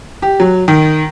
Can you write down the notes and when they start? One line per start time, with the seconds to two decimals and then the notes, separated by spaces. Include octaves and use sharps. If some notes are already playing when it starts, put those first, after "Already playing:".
0.22 G4
0.40 F#3
0.68 D#3